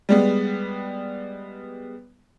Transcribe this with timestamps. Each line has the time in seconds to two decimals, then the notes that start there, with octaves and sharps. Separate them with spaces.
0.09 G3 G#3 B3